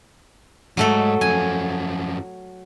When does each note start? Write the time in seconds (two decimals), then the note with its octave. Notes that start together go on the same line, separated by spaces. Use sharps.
0.77 F2 G#2 F#3 A3 A4
1.21 F#2 F3 G#5